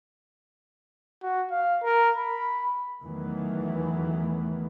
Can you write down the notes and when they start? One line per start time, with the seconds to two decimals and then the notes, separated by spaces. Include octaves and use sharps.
1.23 F#4
1.51 F5
1.83 A#4
2.17 B5
3.03 E2 D#3 E3 F#3 A3